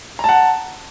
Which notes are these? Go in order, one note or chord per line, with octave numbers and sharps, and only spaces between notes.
F#5 A5 A#5